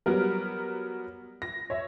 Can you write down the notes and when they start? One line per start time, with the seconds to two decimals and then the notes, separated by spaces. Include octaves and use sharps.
0.06 F#3 G3 B3 A#4
1.42 A#6
1.70 C#5 E5